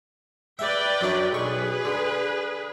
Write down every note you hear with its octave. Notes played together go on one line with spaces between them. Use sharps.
B4 D5 E5 G5
F#2 F#3 D4
B1 G#4 B4 C#6
D3